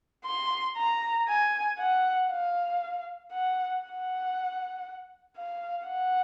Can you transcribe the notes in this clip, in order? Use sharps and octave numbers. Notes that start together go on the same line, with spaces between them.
C6
A#5
G#5
F#5
F5
F#5
F#5
F5
F#5